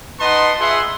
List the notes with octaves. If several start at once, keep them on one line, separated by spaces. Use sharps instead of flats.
D#4 B4 D#5 F#5 A5 C6
F4 G#4 B4 E5 F#5 C6